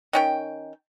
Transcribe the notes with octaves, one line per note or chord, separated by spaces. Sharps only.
D#3 C#4 G5